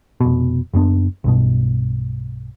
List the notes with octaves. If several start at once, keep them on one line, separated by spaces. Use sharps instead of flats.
F1 B2
F#1 F#2 B3 D4
B1 G2 B2